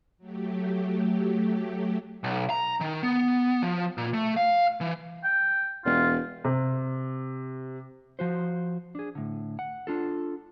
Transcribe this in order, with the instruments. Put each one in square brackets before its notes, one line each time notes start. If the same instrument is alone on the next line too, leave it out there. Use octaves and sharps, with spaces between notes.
[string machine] F#3 A3 G4
[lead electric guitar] B1
A#5
D#3
B3
F3
A#2
A3
F5
E3
[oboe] G5
[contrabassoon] E1 [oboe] F4
[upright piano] C3
[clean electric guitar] F3 F#4 C5
D4 G#4
A2 D3
F#5
D4 F4 A4